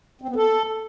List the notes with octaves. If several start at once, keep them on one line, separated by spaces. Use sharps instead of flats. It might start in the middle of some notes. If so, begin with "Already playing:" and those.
C4
B3
A4